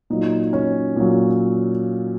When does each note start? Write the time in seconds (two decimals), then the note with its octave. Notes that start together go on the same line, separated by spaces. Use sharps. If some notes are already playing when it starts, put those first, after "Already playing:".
0.10 A#2 F#3 D#4
0.53 C#4
0.96 A#2 F#3